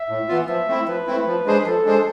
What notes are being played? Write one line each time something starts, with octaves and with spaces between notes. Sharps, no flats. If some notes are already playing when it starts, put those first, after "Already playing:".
Already playing: E5
A2
E3 B3 F4
F3 E5
A3 C4 E4
F3 B4
A3 C4 E4
F3
G#3 D4 G#4 C5
F3 A4
G#3 D4 G#4 C5